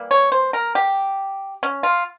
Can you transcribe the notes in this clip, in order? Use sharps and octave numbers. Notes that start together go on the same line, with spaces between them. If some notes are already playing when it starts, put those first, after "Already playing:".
Already playing: E3 G3 A#3
C#5
C5
A#4
G4
C#4
F4